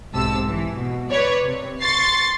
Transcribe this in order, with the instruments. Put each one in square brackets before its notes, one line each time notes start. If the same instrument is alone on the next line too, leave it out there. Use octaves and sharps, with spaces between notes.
[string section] B1 G#2 C3 A5 E6
E3
B2
B4 C#5 D5
C3
C6 C#6 A6 C7